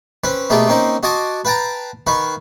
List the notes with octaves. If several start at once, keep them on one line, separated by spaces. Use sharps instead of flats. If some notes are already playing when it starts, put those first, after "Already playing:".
C4 C#4 B4
B2 A3 A#3 F4 G4 G#4
A#3 C4 C#4 D#4 C5
F#4 D#5 G#5 A5 C6 D6
B4 F5 G5 A5 A#5
D#3 B4 F5 C#6